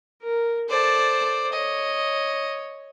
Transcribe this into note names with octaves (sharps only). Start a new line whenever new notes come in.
A#4
A4 C5 D5 A5
C#5 D#5